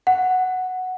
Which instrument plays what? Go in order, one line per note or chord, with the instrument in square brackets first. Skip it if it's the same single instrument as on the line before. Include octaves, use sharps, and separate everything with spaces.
[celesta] F#5